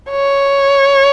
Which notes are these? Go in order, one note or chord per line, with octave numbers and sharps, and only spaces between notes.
C#5